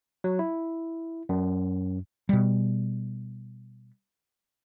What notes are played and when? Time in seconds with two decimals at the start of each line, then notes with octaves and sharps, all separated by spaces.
0.24 F#3
0.39 E4
1.29 F#2
2.29 B2 G3